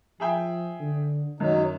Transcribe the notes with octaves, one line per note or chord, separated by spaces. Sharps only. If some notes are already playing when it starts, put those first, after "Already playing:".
F3 G#4 E5 G5
D3
F#2 D#3 F#3 D#4